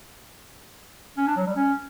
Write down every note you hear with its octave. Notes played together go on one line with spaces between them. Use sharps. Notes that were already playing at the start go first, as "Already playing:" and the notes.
C#4
D4
F#3
G3
C#4